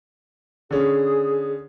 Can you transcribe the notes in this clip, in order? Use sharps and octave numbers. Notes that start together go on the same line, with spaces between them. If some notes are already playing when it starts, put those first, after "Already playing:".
D3 C#4 G#4